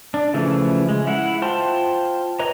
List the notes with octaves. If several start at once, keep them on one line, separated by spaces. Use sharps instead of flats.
D4
C#3 E3 F3 A3 E4
G#3
E4 F#5
F4 C5 G5 A5 C6
B4 C#5 D#5 A#5